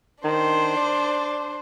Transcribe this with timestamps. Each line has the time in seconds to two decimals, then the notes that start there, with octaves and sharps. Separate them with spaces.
0.24 D#3 D4 C5
0.77 D5